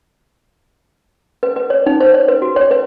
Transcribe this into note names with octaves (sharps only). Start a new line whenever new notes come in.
B4
B4
C#5
D#4
C5
C#5
B4
F#4
C#5
B4